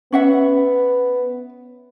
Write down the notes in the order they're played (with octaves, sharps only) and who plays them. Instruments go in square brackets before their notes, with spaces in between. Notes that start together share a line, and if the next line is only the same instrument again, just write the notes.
[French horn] B3 [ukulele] C#4 E5 F#5